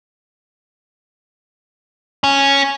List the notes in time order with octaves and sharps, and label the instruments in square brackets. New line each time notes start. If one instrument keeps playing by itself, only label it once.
[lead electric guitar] C#4